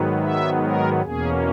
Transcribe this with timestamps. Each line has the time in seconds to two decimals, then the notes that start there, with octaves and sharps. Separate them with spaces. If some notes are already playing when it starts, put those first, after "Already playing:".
Already playing: G#2 D#3 F#3 B3
0.21 E5
0.61 A#4
1.01 E2 B2 A#3 C#4 G#4